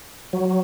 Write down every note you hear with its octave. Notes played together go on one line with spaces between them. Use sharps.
F#3